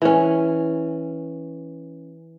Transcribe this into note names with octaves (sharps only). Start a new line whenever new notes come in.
E3 C#4